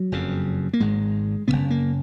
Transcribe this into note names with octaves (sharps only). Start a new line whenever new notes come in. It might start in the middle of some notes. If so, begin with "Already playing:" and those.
Already playing: F#3
F#1 F2 C#3
A#3
G#1 G#2 G#3
F#1 F2 C#3 B3
A#3